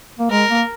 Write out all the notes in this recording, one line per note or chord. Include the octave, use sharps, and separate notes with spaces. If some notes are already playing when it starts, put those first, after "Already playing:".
A#3
G#3 A#4
A#3